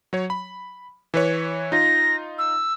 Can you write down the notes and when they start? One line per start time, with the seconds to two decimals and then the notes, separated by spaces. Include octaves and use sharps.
0.13 F#3 C#5
0.30 B5
1.14 E3 B4 C#5
1.72 D#4 F4 A#6
2.38 E6